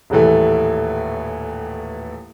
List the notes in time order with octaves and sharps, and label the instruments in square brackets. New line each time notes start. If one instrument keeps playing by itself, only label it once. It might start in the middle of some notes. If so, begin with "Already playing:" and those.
[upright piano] D#1 A2 E3 A3